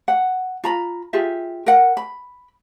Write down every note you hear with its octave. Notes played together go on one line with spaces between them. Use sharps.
F#5
F4 A#5 B5
F4 G4 G#4 E5
A#4 F#5
B5